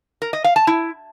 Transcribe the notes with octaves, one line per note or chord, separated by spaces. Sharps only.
A#4
D#5
F5
A5
E4